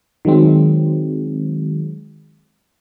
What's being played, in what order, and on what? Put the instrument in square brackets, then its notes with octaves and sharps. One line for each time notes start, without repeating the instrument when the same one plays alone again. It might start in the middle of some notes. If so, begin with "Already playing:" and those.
[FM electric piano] D#3 F#3 G#3 C4